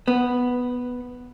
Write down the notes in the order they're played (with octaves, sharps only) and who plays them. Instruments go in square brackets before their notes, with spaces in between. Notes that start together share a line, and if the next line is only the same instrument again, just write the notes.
[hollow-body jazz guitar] B3